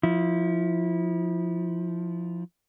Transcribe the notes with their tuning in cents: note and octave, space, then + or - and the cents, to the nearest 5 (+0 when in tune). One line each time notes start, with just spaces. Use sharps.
F3 +0 E4 -25